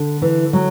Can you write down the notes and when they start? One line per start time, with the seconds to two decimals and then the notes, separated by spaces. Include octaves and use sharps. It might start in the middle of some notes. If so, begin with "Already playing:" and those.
Already playing: D3
0.22 E3
0.53 F#3